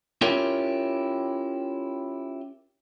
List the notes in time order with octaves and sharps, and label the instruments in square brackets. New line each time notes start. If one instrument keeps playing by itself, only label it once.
[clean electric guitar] C#4 E4 F4 G4 A#4 C#5